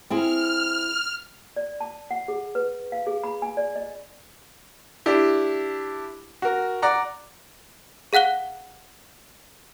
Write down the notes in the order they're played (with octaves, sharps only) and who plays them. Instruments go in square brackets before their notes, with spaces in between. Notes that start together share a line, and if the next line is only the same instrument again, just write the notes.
[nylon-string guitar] C4 E4 G#4 [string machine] F6
[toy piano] D5
A5
F#5
G#4
B4
F5
G#4
B5
G#5
D5
D#5
[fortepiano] D4 E4 G4
F#4 A#4
D5 F#5 A#5
[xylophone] G#4 F5 F#5 F#6 G7